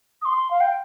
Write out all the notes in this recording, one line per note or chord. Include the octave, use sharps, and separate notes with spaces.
D#6
C6
F5
G5